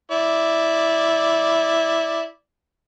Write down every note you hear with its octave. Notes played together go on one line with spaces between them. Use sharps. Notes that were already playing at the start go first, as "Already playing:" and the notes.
E4 D5